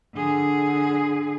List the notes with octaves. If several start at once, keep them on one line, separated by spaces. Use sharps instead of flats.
D3 G#4